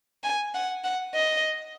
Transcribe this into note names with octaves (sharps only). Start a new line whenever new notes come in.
G#5
F#5
F#5
D#5